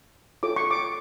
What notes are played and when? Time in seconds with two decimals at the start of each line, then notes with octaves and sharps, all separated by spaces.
0.43 F4 A4 C#5 D6
0.56 C#6
0.71 D6